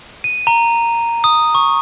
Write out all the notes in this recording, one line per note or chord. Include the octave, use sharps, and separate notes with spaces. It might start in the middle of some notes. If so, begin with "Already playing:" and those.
D#7
A#5
D#6
C#6